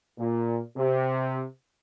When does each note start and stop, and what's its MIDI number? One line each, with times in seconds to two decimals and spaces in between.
0.18 0.60 46
0.77 1.44 48